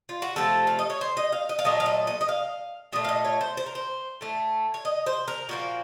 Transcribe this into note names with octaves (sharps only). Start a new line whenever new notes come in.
F4
F#4
C3 F3 A3 A4
F5
D#5
C#5
C5
D#5
F5
D#5
F5
A#2 F#3 A3 D#5
F5
D#5
D#5
D#5
F5
A#2 A3 D#5
F5
D#5
C#5
C5
C5
A#4
C5
A2 A3
C#5
D#5
C5
A#4
A#2 F3 A#3 F#4